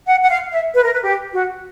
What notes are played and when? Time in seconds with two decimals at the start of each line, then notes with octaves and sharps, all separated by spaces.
0.08 F#5
0.23 F#5
0.30 F5
0.52 E5
0.74 B4
0.83 A#4
0.93 B4
1.03 G4
1.33 F#4